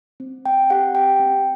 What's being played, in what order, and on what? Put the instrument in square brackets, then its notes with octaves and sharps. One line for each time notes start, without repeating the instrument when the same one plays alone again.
[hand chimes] C4
C4 G5
G4 F#5
G4 G5
C4